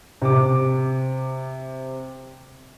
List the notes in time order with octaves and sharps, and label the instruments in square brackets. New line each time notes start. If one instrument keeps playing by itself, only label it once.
[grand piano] C3 D6